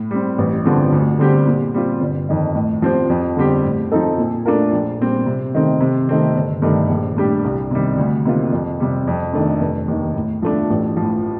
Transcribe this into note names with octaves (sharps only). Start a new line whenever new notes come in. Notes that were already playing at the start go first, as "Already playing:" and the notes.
Already playing: A2
G3 C4
A1
G2 D3 F3 C4
D2
D3 G3 C4 G4
A#2
G3 C4 F4
G1
F2 D#3
A2
F3 C4 G4 C5
F2
D3 G3 C4 G4
A2
F3 C4 D#4 A4
A#2
A3 D4 F4 A#4
A#1
A#2 G3 C4
C3
D#3 A3 C4
C3
D#3 A3 C4
G1
G2 D#3 A3
A#1
A2 G3 D4 G4
C2
C3 D#3 G3
D2
C3 D#3 A#3 F4
F2
C3 G3
F2
D#3 A3 D4
F1
D#2 D#3
A2
F3 A3 D4
A1
F3
A2